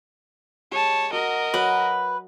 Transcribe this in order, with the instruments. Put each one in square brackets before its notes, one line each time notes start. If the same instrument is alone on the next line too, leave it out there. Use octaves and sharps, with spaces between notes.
[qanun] G#3 G4 [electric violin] C#5 A5
[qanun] F#4 [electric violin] A#4 D#5
[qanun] F#3 [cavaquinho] B4